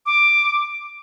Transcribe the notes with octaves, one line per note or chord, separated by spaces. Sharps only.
D6